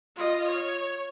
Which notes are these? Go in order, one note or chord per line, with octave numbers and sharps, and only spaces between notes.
F4 D#5
C#5